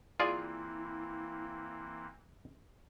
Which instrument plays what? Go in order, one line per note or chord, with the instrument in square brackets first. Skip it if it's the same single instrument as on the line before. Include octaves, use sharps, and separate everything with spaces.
[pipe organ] E3 A#3 C4 [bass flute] E4 [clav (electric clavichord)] F4 G#4 D5